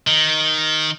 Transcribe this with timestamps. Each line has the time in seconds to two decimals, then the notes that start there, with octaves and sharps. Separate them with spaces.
0.07 D#3